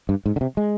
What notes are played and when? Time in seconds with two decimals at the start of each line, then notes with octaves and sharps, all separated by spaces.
0.09 G2
0.26 G#2
0.36 D3
0.41 C3
0.57 G#3